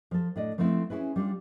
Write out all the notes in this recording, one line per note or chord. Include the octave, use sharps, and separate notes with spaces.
F3 A4
A2 D4 D5 D#5
F3 A3 B3 C4 E4
C#4 D4 E4 G#4 B4
G3 D4 F4